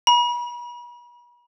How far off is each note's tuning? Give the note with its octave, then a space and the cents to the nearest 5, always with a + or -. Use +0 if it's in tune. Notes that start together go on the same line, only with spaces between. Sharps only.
B5 -40